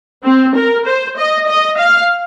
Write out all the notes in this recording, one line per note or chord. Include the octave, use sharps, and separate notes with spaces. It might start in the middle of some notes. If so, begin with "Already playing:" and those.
C4
A#4
C5
D#5
D#5
F5